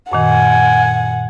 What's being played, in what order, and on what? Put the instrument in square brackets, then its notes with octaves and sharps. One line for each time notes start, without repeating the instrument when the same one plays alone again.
[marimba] F#2 A#2 D#3 [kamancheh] F#5 [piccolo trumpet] G#5